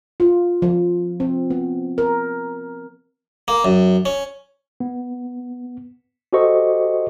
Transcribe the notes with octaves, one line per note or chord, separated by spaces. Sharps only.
F4
F3
C4
B3
A#4
A#3
F#2
C#4
B3
F#4 G4 A4 C5 D#5 C#6